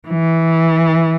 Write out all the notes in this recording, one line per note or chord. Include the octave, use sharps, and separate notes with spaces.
E3